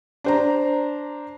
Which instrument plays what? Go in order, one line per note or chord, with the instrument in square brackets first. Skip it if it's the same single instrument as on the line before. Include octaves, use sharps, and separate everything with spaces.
[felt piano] D4 C5 A#5